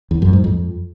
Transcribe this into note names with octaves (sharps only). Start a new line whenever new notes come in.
E2
F#2
G#2
F2